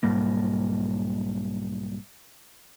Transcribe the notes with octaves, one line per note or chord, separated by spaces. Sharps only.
B1 G#2 G3 A#3